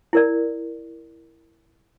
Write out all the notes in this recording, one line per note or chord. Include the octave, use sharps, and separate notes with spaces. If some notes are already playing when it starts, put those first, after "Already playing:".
E4 A#4 D5